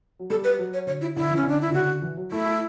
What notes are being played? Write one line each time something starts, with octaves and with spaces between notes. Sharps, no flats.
F#3
G3 A4
B4
F#3
C#5
D3 C#5
E4
D3 E4
E3
C#4
D3 D4
E4
C#3
D3 F#4
E3
F#3
A3 E4
A3